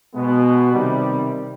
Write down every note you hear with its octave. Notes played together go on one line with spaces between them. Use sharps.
B2 G#3 B3
C3 D#3 G3